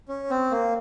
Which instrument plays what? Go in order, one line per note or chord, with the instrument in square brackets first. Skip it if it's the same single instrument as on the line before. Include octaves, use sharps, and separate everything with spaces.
[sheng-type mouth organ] C#4
C4
A#3